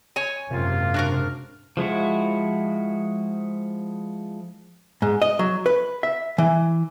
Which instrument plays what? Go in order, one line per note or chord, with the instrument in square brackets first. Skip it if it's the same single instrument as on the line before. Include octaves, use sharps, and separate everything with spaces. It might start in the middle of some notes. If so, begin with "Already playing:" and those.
[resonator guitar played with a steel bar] C#5 G#5
[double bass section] F#1 G#2 C4 [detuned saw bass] C3 [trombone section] A#3 F4
[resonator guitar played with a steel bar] D4 F#4 A#4
[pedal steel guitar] F3 G#3 E4 F#4
[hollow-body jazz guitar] G#2
D#5
F#3
B4
E5
E3